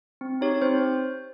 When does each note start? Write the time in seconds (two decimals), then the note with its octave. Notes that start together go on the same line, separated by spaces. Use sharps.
0.21 C4
0.41 D#4 G4 C#5
0.62 C4 C5